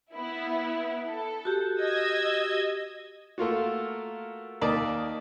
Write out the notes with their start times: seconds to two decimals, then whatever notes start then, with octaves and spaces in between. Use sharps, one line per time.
0.13 B3 E4
1.08 A4
1.45 F#4 G4
1.79 D#5 E6 G#6
3.38 A3 A#3 F4 F#4
4.61 D#2 A#3 D5 A5 D#6